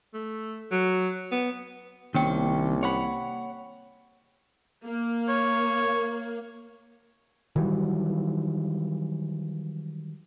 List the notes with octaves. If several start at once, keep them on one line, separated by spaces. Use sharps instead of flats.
A3
F#3
B3
C2 D#3 A#3 C#4 C#5 G5
C#5 F#5 B5
A#3
C#5
D#3 E3 F#3 G3